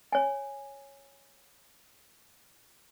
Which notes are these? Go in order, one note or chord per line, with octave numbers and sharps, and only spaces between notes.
C#5 G#5